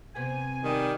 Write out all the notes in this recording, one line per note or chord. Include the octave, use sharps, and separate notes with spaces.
C3 B3 G#5
D#3 G3